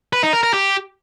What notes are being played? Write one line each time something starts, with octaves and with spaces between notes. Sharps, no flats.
B4
D#4
A#4
A#4
G4